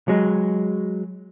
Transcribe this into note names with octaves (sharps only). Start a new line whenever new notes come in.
F#3 G#3